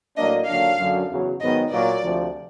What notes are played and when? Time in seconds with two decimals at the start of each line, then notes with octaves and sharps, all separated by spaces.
0.17 A2 F#3 A#3 D4 D#5
0.48 D#2 D3 F#3 A#3 D4 F5
0.78 F#2 D3 F#3
1.10 E2 C#3 F#3
1.41 G#2 D#3 F#3 B3 D#5
1.71 A#2 F#3 A#3 D5
2.03 D2 C3 F3